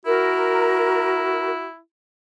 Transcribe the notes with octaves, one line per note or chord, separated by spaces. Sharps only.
E4 F#4 A#4